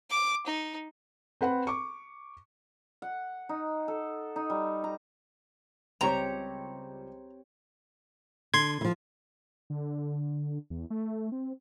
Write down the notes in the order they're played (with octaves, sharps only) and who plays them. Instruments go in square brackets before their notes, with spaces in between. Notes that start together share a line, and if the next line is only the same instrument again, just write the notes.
[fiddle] D6
D#4
[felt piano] C4 B4 F#5 B5
C#6 D6
[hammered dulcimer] F#5
D#4
A4
D#4
G3
A#5
[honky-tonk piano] C#2 G3 [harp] C4 G4 C#5 [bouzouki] A#5
[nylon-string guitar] D3 [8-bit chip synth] C6 G#6
[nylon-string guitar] E3 F3
[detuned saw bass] D3
E2
A3
C4